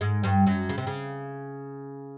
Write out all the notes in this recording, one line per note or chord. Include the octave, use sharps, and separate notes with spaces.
G#2 G#3
G2 G3
F#2 F#3
C#3
C3
C#3